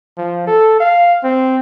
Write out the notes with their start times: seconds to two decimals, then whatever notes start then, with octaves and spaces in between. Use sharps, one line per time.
0.17 F3
0.47 A4
0.80 F5
1.24 C4